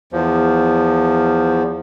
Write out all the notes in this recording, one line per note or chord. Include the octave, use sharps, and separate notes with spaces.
E2 F3